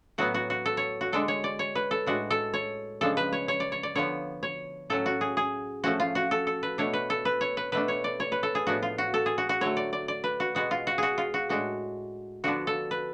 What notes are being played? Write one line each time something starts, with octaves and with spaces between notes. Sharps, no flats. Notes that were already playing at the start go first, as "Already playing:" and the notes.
A2 F#3 B3 F#4
F#4
F#4
A4
C#5
F#4
D3 G#3 D4 A4
C#5
D5
C#5
B4
A4
A2 G#3 D4 F#4
A4
C#5
C#3 F3 G#3 D4 A4
B4
C#5
C#5
D5
C#5
D5
D3 F3 B3 C#5
C#5
A2 F#3 C#4 A4
F#4
G#4
G#4
F3 A3 C#4 F#4
F4
F#4
A4
A4
B4
B2 A3 D4 C#5
B4
A4
B4
C#5
B4
B2 A3 D4 B4
C#5
D5
C#5
B4
A4
G#4
A2 F3 B3 D4 F#4
F4
F#4
A4
G#4
F#4
F#4
D3 F#3 A3 C#5
D5
D5
D5
B4
F#4
B2 G#3 B3 F#4
F4
F#4
F#4 G#4
F4
F#4
A2 G#3 D4 F#4
D3 F3 B3 D4 F#4
A4
B4